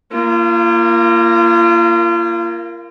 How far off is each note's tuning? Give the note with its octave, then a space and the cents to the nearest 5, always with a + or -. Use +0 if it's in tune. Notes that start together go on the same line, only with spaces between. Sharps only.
A#3 +0 F4 -35